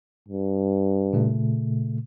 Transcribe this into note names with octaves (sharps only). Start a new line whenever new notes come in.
G2
A#2 C#3 A3